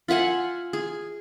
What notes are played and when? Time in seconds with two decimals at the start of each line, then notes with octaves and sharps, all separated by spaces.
0.08 F4 E5 F#5 G#5
0.73 G#4